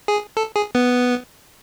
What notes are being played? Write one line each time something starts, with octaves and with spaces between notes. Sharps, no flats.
G#4
A4
G#4
B3